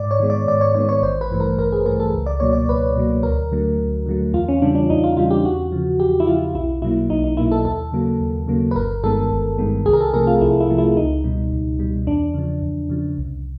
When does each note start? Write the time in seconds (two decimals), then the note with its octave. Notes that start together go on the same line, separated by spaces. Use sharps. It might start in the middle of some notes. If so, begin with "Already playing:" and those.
Already playing: G#2 D5
0.11 C#5
0.19 D#3 G#3 B3
0.30 D5
0.47 G#2 D5
0.61 C#5
0.75 D#3 G#3 B3 C#5
0.89 C#5
1.02 A1 C5
1.21 B4
1.31 G2 E3 A3
1.40 A#4
1.57 A1 A#4
1.72 G#4
1.86 G2 E3 A3 A#4
2.00 A4
2.14 C#2
2.26 D5
2.40 B2 F#3 A#3 C#5
2.53 D5
2.68 C#2 B4
2.96 B2 F#3 A#3
3.23 D2 A#4
3.52 D3 F#3 A3
3.79 D2
4.06 D3 F#3 A3
4.33 E2 F4
4.48 C#4
4.62 C#3 E3 G3 D4
4.75 D4
4.90 E2 D#4
5.04 F4
5.17 C#3 E3 G3 F4
5.30 G4
5.44 E2 F#4
5.72 C#3 F3
5.99 E2 G4
6.20 E4
6.27 C#3 F3 F4
6.54 B1 E4
6.82 B2 F#3 A#3 E4
7.10 B1 D#4
7.24 D#4
7.37 B2 F#3 A#3 E4
7.51 A4
7.65 D#2 A4
7.92 C#3 F#3 A#3
8.21 D#2
8.48 C#3 F#3 A#3
8.71 B4
8.76 G1 A#4
9.03 G2 D#3 G#3 B3 A4
9.32 G1
9.58 G2 D#3 G#3 B3
9.86 C2 G#4
9.93 A#4
10.01 A4
10.13 C3 F3 A3 A#4
10.27 F4
10.41 C2 E4
10.60 E4
10.69 C3 F3 A3
10.78 E4
10.96 C#2 D#4
11.24 B2 G3
11.52 C#2
11.79 B2 G3
12.07 E2 D4
12.34 C#3 F3
12.62 E2
12.90 C#3 F3
13.18 C2